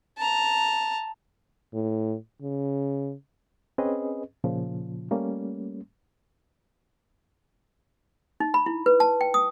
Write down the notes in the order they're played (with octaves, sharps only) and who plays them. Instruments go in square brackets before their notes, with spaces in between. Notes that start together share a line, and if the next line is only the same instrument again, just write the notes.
[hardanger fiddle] A5 A#5
[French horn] A2
C#3
[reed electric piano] C4 C#4 G#4 B4 D#5
A#2 C#3 F3
G3 A3 A#3 C#4
[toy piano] D#4
B5
E4
B4
A5
G5
D#6